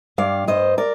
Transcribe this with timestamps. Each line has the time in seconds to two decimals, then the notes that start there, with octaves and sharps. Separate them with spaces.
0.18 G2 D5 F5
0.47 G2 C5 D#5
0.78 A#4 D5